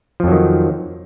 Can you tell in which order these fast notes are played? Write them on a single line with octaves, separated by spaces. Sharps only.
F3 F2 F#3 D#3